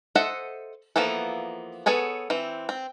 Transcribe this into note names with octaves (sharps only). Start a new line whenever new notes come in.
A4 C5 D#5 E5 F#5
E3 F3 A#3 B3 A4
B3 G#4 A4 C#5
E3 C4
C4